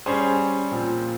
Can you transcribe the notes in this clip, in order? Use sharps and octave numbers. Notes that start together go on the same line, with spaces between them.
G3 C#4 G#4 C5
A#2 F3 C4